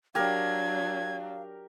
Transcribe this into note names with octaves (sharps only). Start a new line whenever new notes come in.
F#3 D4 G4 A#4 F5 G#6